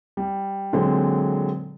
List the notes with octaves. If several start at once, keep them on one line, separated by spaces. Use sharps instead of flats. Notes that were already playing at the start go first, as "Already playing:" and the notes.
G3
A#2 D3 F#3 G#3 C4